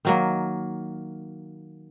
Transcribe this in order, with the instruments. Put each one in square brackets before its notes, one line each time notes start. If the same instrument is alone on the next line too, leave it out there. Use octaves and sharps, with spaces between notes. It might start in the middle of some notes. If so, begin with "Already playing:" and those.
[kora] D#3 F#3 A#3